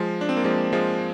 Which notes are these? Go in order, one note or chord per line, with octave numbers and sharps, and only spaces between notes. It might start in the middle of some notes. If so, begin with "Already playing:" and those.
Already playing: F3 G#3
D4
C4
A#3
F3 G#3
F3 G#3